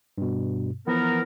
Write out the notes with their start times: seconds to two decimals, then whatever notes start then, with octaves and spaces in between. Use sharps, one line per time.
0.18 G2 B2
0.87 E3 F3 B3 A#4